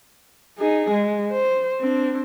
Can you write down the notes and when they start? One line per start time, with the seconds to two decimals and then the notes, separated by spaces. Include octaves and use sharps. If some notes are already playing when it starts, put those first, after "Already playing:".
0.58 D#4 G#4
0.91 G#3
1.32 C5
1.80 C4 D4